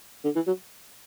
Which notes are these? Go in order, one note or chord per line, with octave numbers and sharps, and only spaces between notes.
D3
E3
F#3